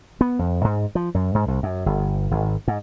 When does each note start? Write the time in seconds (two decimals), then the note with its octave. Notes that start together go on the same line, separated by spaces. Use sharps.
0.21 B3
0.39 F2
0.64 G#2
0.95 F3
1.14 F#2
1.35 G#2
1.48 C2
1.63 F#2
1.86 G1
2.31 G#1
2.68 G#2